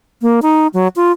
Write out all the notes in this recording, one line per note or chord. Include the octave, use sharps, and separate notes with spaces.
A#3
D#4
F#3
F4